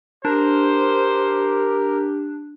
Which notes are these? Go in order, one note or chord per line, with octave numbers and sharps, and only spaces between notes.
D4 G4 A#4 C5